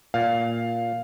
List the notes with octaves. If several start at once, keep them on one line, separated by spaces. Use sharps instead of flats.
A#2 F5